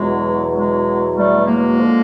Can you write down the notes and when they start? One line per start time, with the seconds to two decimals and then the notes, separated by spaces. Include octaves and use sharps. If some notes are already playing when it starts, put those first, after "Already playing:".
Already playing: E2 B2 F#3 G#3
0.53 G#3
1.15 G3 A3
1.47 G#3 A#3
1.79 D3 F3